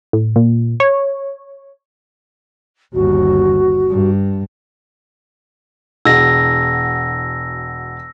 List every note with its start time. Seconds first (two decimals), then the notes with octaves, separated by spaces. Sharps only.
0.13 A2
0.36 A#2
0.80 C#5
2.94 G1 D#2 F#4
3.90 G2
6.05 E1 F#4 E6 A#6